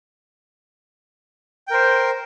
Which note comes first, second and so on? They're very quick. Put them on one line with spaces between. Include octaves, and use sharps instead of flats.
G5 A#4 C5